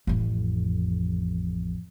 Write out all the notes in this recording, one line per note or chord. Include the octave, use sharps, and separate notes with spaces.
A1 F2